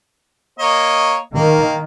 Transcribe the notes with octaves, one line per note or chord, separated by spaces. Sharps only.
A#3 C#5 D#5
D#3 A#3